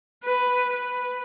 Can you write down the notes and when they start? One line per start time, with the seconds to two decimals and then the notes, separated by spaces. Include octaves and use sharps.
0.23 B4
0.73 B4